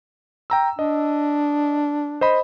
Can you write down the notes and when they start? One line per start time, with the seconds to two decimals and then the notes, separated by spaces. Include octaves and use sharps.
0.50 G5 A#5 E6
0.79 D4 D#5
2.21 C5 D#5 B5